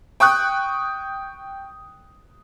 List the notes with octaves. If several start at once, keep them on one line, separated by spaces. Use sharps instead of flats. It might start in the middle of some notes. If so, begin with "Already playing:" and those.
G5 C#6 D#6 F#6